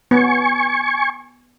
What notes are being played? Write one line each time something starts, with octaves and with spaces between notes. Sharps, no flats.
B3 G#5 C#6